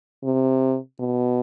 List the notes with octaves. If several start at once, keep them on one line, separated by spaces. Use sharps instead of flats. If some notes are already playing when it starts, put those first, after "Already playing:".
C3
B2